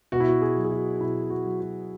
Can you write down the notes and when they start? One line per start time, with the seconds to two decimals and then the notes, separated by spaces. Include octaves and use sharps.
0.12 B2 F#4
0.20 E4
0.29 F#4
0.42 G#4
0.56 F#3
0.64 G#4
0.71 F#4
1.01 B2 E4
1.30 F#4
1.45 F#3
1.60 F#4